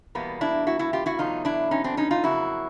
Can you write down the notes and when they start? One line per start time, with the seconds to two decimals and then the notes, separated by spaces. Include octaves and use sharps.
0.15 E2 B2 G3 A#3 B3
0.41 D4 E4
0.67 E4 F#4
0.79 E4 F#4
0.93 F4 G4
1.06 E4 F#4
1.19 E2 B2 F#3 A3 D#4 F4
1.45 D4 E4
1.71 C#4 D#4
1.84 C4 D4
1.97 C#4 D#4
2.11 D#4 F4
2.23 F2 C#3 F#3 A#3 E4 F#4